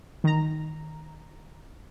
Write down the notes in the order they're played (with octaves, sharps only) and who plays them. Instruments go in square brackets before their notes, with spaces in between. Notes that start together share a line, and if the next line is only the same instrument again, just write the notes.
[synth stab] D#3 A#5